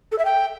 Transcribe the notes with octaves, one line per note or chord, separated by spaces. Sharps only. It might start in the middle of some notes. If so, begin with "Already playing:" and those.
A4
E5
G5